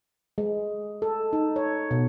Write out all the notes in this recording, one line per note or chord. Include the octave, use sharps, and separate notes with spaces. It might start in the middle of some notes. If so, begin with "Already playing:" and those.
G#3
A4
D#4
C#5
B2